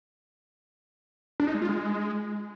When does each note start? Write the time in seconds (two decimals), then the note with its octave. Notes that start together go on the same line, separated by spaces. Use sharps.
1.40 D4
1.47 D#4
1.54 G#3
1.62 F4
1.69 G#3